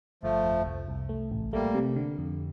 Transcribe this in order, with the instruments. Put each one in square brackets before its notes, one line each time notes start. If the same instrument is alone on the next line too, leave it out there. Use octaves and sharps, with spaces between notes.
[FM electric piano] G1 [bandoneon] F3 A3
[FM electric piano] F2
C2
C2
A3
A1
[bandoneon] G3 A#3 [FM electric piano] A3
[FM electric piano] C3
D3
F2